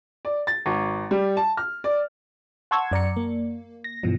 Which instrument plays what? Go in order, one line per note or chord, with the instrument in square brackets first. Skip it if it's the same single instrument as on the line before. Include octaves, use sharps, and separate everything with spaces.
[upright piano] D5
A6
G#1
G3
A5
F6
D5
[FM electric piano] F#5 A5 C6 C#6 E6 G#6
F#2 D5 A#5 C#7
A#3
A#6
G2 B2 E3 F3